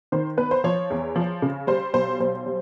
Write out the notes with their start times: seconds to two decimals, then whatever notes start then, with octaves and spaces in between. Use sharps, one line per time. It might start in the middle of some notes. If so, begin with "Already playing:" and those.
0.12 D#3 C5
0.37 B3 B4
0.51 C5
0.64 F3 C#5
0.90 E2
1.16 F3
1.42 C#3
1.67 G3 C5
1.93 B1 C5
2.20 B1 C5
2.46 G3